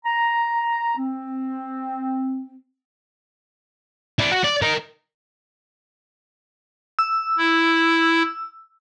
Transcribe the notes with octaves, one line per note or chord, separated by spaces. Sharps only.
A#5
C4
E4 D5
F#4 F#5
D5
D#4 A#4
E6
E4